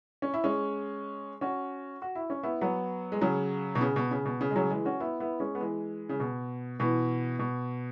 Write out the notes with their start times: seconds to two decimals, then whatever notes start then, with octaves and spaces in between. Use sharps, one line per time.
0.22 C#4
0.34 E4
0.44 G#3 C#4
1.41 C#4 F#4
2.02 F#4
2.15 E4
2.30 C#4
2.43 B3 E4
2.61 F#3 B3
3.12 G#3
3.21 C#3 F#3
3.75 B2
3.81 C#3
3.96 B2
4.11 C#3
4.25 B2
4.41 C#3
4.50 G#3
4.56 C#3 F#3
4.70 E3 G#3
4.85 C#4 F#4
5.00 B3 E4
5.20 B3 E4
5.40 G#3 C#4
5.55 B3
5.60 E3 G#3
6.09 C#3
6.20 B2
6.80 B2 E3
7.39 B2